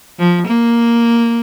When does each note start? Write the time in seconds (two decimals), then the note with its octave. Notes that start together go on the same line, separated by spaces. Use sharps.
0.19 F3
0.47 A#3